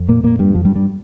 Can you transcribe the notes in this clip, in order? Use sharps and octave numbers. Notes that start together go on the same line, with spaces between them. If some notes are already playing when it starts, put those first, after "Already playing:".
Already playing: F2
A#2 A#3
A#2 A#3
G2 G3
F2 F3
G2 G3
G2 G3